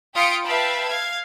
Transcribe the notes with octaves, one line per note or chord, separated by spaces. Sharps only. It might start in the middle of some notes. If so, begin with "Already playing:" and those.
F4 G5 D#6 B6 C#7 D7
B4 E5 F5 G5 A5 B5
F5 G#6